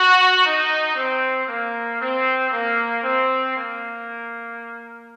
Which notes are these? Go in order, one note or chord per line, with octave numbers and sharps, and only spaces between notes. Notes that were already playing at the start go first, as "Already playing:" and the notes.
Already playing: F#4
D#4
C4
A#3
C4
A#3
C4
A#3